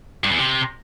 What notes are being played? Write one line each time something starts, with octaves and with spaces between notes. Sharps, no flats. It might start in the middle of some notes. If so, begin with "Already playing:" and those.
G2
E2
C3